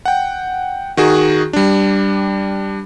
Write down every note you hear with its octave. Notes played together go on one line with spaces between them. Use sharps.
F#5 G5
D#3 F#4 G#4
G3 D4